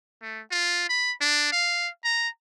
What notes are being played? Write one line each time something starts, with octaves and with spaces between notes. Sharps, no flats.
A3
F4
B5
D4
F5
A#5